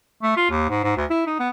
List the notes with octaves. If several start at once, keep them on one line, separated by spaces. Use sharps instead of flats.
A3
F4
D#2
G#2
G#2
D2
E4
D#4
B3